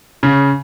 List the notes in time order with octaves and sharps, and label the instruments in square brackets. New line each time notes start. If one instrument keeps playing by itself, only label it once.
[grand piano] C#3